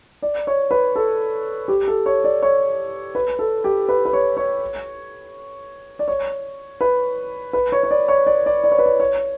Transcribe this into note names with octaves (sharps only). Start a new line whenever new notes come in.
D5
C#5
B4
A4
G4
A4
C#5
D5
C#5
B4
A4
G4
B4
B4
C#5
C#5
D5
C#5
B4
B4
C#5
C#5
D5
C#5
D5
D5
D5
C#5
B4
C#5
C#5